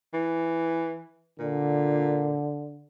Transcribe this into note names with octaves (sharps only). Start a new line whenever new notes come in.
E3
A#2 D3